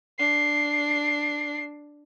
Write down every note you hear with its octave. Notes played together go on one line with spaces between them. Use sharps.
D4 C7